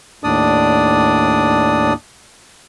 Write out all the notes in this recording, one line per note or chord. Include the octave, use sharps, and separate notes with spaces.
D#2 A2 D4 D5 D#6